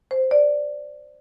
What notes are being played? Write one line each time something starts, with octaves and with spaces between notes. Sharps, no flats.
C5
D5